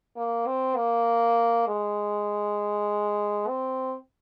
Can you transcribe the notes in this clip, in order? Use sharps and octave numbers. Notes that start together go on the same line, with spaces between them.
A#3
C4
A#3
G#3
C4